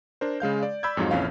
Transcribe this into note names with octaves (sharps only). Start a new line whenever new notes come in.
D4 A#4 C5
C#3 G#3 F5 G6
D5
D5 B5 E6 G6 G#6
F2 G#2 F#3 D#4 F4
A#1 F2 E3 C#4 F5